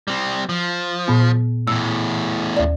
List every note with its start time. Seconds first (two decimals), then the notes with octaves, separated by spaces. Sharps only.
0.08 G3 C4
0.49 F3
1.08 A#2 B3
1.68 E2 A2 E6
2.57 D#2 D5